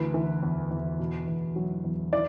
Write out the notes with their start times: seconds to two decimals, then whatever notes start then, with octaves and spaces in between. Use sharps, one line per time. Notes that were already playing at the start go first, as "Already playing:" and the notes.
Already playing: D2 E3 B4
0.14 E3
0.43 E2
0.71 E2
0.99 B2
1.27 E2
1.56 F#3
1.84 E2
2.13 E3 D5